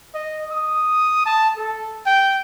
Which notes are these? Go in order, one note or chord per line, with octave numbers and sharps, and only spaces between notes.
D#5
D#6
A5
A4
G5